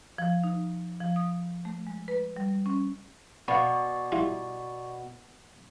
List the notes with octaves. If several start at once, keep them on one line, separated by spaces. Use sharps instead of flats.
F3
D#4
F3
D#6
A3
G#3
B4
G3
C#4
B2 B3 D5 F5 B5 C#6
G3 E4 F4